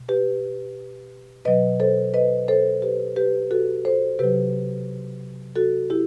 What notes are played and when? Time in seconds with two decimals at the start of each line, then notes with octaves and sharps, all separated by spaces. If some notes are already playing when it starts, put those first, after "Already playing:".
Already playing: B2
0.09 G4 B4
1.45 B2 F#3 B4 D#5
1.80 A4 C5
2.14 B4 D#5
2.48 A4 C5
2.82 G4 B4
3.16 G4 B4
3.51 F#4 A4
3.85 A4 C5
4.19 C3 F#3 G4 B4
5.56 F#4 A4
5.90 E4 G4